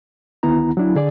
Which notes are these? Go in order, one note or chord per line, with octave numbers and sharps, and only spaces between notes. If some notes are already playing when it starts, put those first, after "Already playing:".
D2 D#3 B3 E4 A#5
F#3 D4 E4
D3 G#4 D5